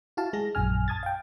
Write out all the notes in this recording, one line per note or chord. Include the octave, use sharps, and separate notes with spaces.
E4 F#4 F5 A5
G#3 G#4 A#6
A#1 F#2 G#5 F6
A5 D#6 G#6 A6
F5 G5